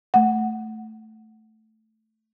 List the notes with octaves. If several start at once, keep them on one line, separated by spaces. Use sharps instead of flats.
A3 F#5